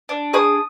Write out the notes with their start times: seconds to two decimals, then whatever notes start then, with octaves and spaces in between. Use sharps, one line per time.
0.09 D4
0.33 G#4 D#6